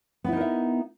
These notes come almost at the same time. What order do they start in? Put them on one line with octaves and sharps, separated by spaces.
B3 E4 D#4 A#4 E5